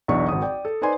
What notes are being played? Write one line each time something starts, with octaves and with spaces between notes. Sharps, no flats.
B1 E2 F#3 D4 C#6
G#1 D#6
D5 G5
A4
D#4 B4 C5 D5 G#5 C6